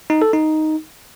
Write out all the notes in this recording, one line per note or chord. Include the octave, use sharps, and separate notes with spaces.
D#4
A4
D#4